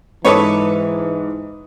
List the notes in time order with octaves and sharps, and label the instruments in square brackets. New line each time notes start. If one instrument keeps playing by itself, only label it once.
[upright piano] G#2 D6 D#6 [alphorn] E3 [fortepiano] A4 B4 C#5